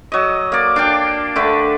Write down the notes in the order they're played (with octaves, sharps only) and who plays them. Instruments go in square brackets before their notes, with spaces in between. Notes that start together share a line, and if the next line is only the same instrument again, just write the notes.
[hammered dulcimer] F#3 D#5
A#3 D5
D4 F5 G5
D3 A3 B4